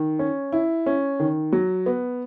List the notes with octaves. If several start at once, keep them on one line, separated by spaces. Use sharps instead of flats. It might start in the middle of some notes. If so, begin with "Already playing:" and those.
Already playing: D#3
C#4
E4
C#4
D#3
F#3
B3